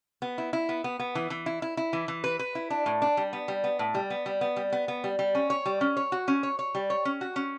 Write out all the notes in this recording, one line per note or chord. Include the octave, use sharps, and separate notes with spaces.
B3
E4
E4
B3
B3
B3
E3
E3
E4
E4
E4
E3
E3
B4
B4
E4
D4
A2
D4
G3
B3
G3
B3
A2
G3
B3
G3
B3
G3
B3
B3
G3
G3
C#4
C#5
G3
C#4
C#5
F#4
C#4
C#5
C#5
G3
C#5
C#4
F#4
C#4